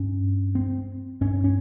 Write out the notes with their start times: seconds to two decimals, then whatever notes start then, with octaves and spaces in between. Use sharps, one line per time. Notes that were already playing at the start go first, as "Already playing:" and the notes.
Already playing: G2 C#4
0.55 C4
1.21 G2 C#4
1.44 C#4